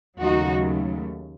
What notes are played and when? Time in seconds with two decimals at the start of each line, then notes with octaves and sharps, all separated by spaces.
0.20 D#2 C#3 F#3 A3 D#4 F#4